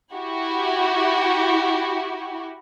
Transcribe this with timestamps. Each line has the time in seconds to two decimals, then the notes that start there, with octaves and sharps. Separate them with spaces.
0.13 E4 F#4 G4